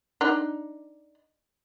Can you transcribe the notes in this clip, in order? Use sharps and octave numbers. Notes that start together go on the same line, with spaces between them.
D4 D#4